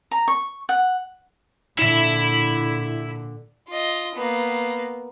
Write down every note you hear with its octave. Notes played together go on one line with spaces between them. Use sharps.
A#5
C#6
F#5
A#2 D3 E4 E5
F4 D#5
A#3 B3